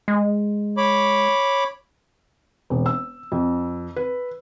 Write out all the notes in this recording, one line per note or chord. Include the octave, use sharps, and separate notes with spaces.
G#3
C#5 B5 D6
E1
E6
F2
B4